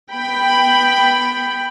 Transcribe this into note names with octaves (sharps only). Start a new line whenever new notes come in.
B3 G5 B5